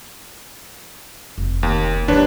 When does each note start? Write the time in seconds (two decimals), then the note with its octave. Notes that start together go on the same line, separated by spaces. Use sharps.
1.38 F1
1.63 D#2
2.08 D#2 F#3 D4 B4 C#5